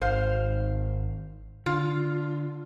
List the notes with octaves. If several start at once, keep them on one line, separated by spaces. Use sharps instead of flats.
G#1 C5 F5
D3 F4